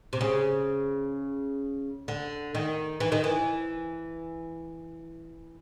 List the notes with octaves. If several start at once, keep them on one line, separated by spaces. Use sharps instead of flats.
C3
C#3
D3
D#3
E3
D#3
E3